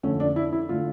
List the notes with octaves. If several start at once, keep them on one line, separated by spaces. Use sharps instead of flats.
F2 D3 A3 C#4
D4
E4
E4
D3 A3 F4